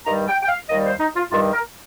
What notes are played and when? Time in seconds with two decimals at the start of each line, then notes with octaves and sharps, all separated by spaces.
0.06 G2 D#3 G3 A#5
0.27 G5
0.42 G5
0.47 F5
0.68 D#2 D#3 G3 D#5
0.85 C5
1.00 D#4
1.15 F4
1.31 G2 D#3 G3 F4
1.52 A#4